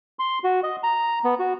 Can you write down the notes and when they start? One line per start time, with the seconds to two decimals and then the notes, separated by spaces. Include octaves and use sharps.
0.19 C6
0.44 F#4
0.63 D#5
0.83 A#5
1.24 B3
1.39 F#4